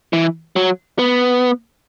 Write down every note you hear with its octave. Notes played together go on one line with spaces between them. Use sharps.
E3
F#3
B3